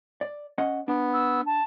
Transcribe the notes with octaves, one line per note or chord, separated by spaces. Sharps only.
D5
C#4 D#5 F#5
B3 D4
E6
A5